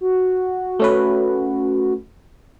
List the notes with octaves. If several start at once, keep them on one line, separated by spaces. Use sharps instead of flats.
F#4
A3 C#4 B4